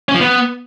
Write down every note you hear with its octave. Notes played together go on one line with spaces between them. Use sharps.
C#4
F3
B3